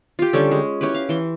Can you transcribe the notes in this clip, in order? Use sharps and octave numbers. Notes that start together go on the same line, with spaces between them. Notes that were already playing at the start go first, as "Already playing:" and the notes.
F4 G4
D3 G3 C#4 A4
G#3
C#4 E4 G4 B4
F5
E3 C6